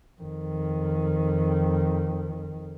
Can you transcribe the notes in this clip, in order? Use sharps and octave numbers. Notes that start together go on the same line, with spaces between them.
F2 D#3